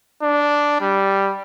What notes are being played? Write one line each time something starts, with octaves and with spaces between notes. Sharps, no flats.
D4
G3